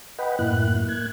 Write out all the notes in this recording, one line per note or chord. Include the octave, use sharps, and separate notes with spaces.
B4 D#5 F#5 G5 B5
F#2 A2 A#3 E4 F#6
A#3 F#6 G#6